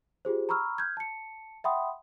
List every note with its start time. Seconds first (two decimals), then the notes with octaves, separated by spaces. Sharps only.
0.25 F4 G4 G#4 C5
0.49 A#5 B5 C#6 E6 F6
0.78 F6 G6 G#6
0.97 A5 C#7
1.64 E5 F#5 G5 B5 C6 D#6